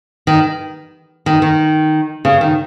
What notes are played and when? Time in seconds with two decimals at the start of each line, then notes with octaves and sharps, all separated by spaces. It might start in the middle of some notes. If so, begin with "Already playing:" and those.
0.27 D#3
1.26 D#3
1.42 D#3
2.25 C#3
2.41 D#3